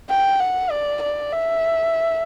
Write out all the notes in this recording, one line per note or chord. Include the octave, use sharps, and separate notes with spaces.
G5
F#5
D5
D5
E5